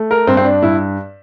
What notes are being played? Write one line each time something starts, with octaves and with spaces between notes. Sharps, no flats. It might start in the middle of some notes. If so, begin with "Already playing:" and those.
Already playing: A3
A#4
G2 C4
C4
D4
G2 E4